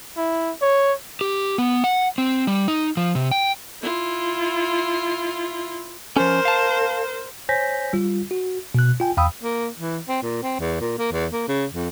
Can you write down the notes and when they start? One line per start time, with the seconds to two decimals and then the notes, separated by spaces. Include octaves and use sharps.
0.17 E4
0.62 C#5
1.21 G4
1.58 B3
1.84 F#5
2.18 C4
2.47 G3
2.68 D#4
2.97 F3
3.15 C3
3.31 G5
3.83 E4 F4
6.17 F3 C#4 A#4 C5
6.45 F5 A5
7.49 C5 C#5 G#5 G6 A#6 B6
7.93 G3 F4
8.31 F#4
8.75 B2 F#6
9.00 F4 G5 G#5
9.17 E2 F5 G5 B5 D#6 E6
9.43 A#3
9.79 E3
10.08 C4
10.22 A#2
10.43 C4
10.60 E2
10.81 A#2
10.98 A#3
11.12 E2
11.33 A#3
11.48 C#3
11.74 F2